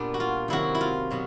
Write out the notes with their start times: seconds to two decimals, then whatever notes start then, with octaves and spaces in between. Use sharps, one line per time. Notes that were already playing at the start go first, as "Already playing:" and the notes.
Already playing: A#2 G3 B3 D4
0.14 F#4
0.20 F4
0.48 C3 D#3 F#3 E4 F#4
0.75 E4
0.81 F4
1.10 B2 F#3